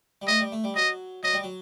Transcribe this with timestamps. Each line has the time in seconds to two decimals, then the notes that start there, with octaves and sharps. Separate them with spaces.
0.22 G3
0.28 A3 D#5
0.40 G3
0.52 A3
0.64 G3
0.76 F#3 D#5
1.23 F#3 D#5
1.33 G3
1.43 F#3